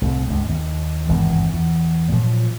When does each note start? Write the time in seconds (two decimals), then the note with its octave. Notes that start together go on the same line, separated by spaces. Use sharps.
0.02 C2 A2 C3
0.27 C#2 G2
0.49 D#2
1.09 G#1 E2 G2 C3
1.53 E2
2.12 A#2 F3 F#3